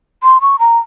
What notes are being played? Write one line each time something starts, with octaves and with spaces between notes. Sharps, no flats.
C6
C#6
A#5